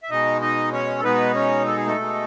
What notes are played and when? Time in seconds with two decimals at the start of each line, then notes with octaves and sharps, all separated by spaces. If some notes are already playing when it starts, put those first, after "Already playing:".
0.03 E5
0.10 B2 G#3 D#4 D#5
0.41 D#4 D#5
0.73 C#4 C#5
0.99 A4
1.03 B2 G#3 B3 D#4 B4
1.35 C#4 C#5
1.66 A4
1.77 G#4
1.87 A3 A4
1.98 B2 G#3 D#4